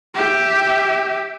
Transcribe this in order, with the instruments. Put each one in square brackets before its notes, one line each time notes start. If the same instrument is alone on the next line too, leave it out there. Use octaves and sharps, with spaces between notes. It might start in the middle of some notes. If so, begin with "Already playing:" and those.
[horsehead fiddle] G4 E5